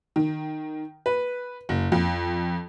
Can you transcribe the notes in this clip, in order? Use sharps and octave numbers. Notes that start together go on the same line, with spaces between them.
D#3
B4
F#1
F2